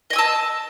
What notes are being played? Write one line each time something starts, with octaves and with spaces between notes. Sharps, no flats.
D#5 G#5 A5 E6